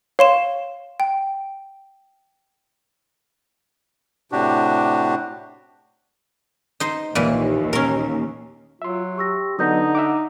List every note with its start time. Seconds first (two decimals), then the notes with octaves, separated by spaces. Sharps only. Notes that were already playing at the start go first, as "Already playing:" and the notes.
0.19 C#5 F5 C6 E7
1.00 G5
4.32 A2 C3 D4 F#4 G4
6.80 D#4 C5
7.15 D#1 A#1 D#2 A#2 E3
7.73 A#2 C#4 A#4
8.82 F#3 F4 E5 C6
9.18 G4 C#6 E6 A#6
9.59 D3 F#3 B3 D#4 D#5 D#6 G6 A#6
9.95 E5 F#5 D6